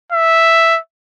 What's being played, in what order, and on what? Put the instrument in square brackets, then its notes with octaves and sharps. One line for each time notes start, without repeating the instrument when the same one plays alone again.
[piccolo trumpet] E5